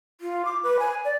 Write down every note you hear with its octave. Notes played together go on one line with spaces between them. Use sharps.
F4
D6
B4
G#5
D5